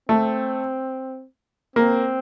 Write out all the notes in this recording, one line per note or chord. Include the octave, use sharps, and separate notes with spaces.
A3 C4
A#3 C4